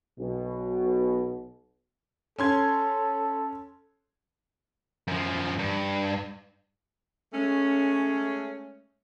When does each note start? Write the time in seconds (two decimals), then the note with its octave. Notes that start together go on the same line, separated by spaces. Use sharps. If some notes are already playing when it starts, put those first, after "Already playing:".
0.19 B1 B2
2.39 C#4 A4 C6 G#6
5.08 F#2 F3
5.59 G2
7.33 G#3 A3 C#4